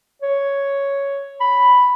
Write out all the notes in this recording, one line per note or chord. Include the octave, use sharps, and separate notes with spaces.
C#5
B5